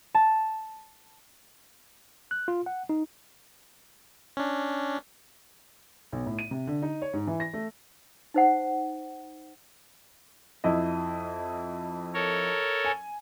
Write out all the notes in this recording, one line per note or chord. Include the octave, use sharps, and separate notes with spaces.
A5
F#6
F4
F#5
D#4
C#4 D4
B1
A2
D#7
C3
D3
D#4
C#5
G#2
E3
A#6
A3
D#4 C5 F#5
F2 E4 D#5
A4 A#4 C#5
G#5